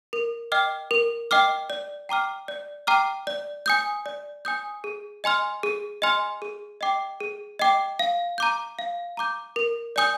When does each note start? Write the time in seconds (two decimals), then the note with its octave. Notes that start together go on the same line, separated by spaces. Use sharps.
0.13 A#4
0.52 D#5 G5 D6 F6
0.91 A#4
1.31 D#5 G5 D6 F6
1.70 D5
2.09 G5 A#5 D6 F6
2.48 D5
2.87 G5 A#5 D6 F6
3.27 D5
3.66 G#5 D#6 G6
4.06 D5
4.45 G#5 D#6 G6
4.84 G#4
5.24 D#5 G#5 C6 F6
5.63 G#4
6.02 D#5 G#5 C6 F6
6.42 G#4
6.81 D#5 G5 D6
7.20 G#4
7.59 D#5 G5 D6
7.99 F5
8.38 A#5 D6 G6
8.79 F5
9.17 A#5 D6 G6
9.56 A#4
9.96 D5 G#5 D#6 G6